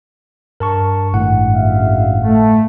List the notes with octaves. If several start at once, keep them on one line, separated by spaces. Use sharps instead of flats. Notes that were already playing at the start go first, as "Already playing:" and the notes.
G2 A#4 A5 C#6
G#1 A2 F#5
F#1 E5 F5
A3